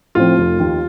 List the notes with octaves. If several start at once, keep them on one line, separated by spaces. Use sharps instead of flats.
A2 F3 C4 F4
F1
D#2 D#3